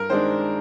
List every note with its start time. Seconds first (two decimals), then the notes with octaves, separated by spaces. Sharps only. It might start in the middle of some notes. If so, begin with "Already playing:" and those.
Already playing: G2 A#4
0.10 D#3 G#3 D4 C5